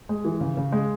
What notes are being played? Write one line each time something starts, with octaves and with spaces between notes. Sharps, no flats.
G#3
E3
C#3
C#3
G#3